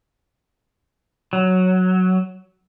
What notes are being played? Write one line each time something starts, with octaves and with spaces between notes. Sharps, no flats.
F#3